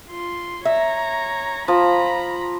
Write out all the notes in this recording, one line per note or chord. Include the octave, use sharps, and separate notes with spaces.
F4 C6
C#5 E5 A#5
F3 A#5 B5